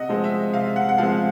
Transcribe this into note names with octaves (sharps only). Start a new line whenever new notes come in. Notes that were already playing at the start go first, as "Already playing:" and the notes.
Already playing: C3 D#5 F#5
F3 G#3 C4
E5
C3 F5
F#5
F#5
F3 G#3 C4 F5